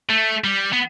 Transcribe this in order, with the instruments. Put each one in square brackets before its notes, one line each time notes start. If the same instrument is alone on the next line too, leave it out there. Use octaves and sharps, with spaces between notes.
[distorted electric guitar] A3
G3
B3